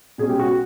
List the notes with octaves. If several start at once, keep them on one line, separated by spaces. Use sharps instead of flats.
B2 G#3 C#4 G#4
G4
F#4